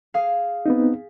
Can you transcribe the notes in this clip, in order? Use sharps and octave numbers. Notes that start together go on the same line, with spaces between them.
G#4 F5
B3 C4 D#4